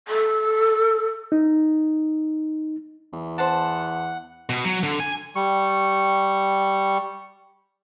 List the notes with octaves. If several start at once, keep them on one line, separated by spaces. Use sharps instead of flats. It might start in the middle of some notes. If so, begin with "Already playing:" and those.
A4
D#4
E2
C5 F#5 A5
B2
F#3
D3
G#5
G3 C#6